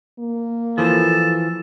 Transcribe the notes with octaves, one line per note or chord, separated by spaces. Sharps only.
A#3
E3 F3 A4